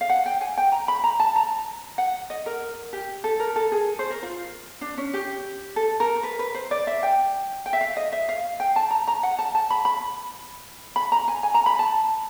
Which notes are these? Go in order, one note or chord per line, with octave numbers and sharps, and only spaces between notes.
F5
F#5
G5
G#5
G5
A#5
B5
A#5
A5
A#5
F#5
D#5
A#4
G4
A4
A#4
A4
G#4
C5
A#4
F4
D4
C#4
G4
A4
A#4
B4
B4
C5
D5
E5
G5
G5
E5
F5
D#5
E5
F5
G5
A5
A#5
A#5
F#5
A5
A5
B5
B5
B5
A#5
G#5
G#5
A#5
B5
A5